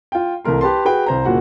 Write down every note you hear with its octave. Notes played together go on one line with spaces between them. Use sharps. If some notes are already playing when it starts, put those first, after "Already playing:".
F4 G5
C2 E3 A3 A#4 C6
G4 B4 A5 C6
F#4 G#4 B4 G5
C2 C5 A#5
F#1 A#2 F#4 F#5